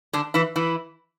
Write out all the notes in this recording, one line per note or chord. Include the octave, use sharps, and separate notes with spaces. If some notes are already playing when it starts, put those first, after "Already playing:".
D3 D4
E3 E4
E3 E4